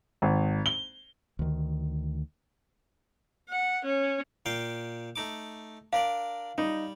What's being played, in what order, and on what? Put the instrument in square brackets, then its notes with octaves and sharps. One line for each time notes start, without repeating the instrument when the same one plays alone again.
[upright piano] G#1
G7
[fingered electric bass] D2 D#3
[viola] F#5
C#4
[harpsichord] A#2 F5 G5
A3 D#4 D6
[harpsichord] D4 A#4 D5 [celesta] F5
[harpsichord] G3 [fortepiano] D#4